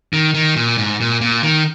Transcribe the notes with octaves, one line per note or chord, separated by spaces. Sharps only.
D#3
D#3
A#2
G#2
A#2
A#2
D#3